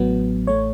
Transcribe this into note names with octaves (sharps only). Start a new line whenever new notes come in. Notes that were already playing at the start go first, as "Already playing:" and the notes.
Already playing: A1 A2 F#3 B3
A1 A2 A3 C#5